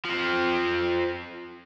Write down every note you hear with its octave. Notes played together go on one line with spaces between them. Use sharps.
F3 C4